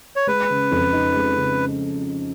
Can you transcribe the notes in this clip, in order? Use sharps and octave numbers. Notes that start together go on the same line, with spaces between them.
C#5
G#3 B4
C#3
F2
D#4
G#3
C#3